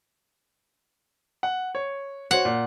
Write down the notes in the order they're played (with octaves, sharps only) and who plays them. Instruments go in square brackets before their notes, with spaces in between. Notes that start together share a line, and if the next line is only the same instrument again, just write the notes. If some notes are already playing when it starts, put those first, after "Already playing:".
[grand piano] F#5
C#5
[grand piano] F#4 C5 C#5 [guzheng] F#5
[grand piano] A#2